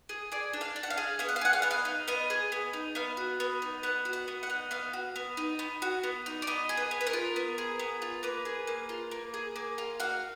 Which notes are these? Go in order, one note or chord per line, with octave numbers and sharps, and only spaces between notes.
G#4
G#4 D5
D4
F5
D4
F#5
F5
G#4
B3 F5
F#5
F5
G#4 F#5
F5
B3 F#5
F5
D#4
B3 D#5
G#4
B3
D#4
B3 F5
F#4
B3
D#4
B3 F#5
F#4
F#5
B3
F#5
D#4
B3 F5
F#4
B3
D#4
B3
F#4
B3
D#4
D5
B3 D#5
G#4
B4
B3
B4
A#4
F4
B3
G#4
B3
F4
A#3 B4
G#4
A#3
F4
A#3
G#4
A#3
F4
F#4 F5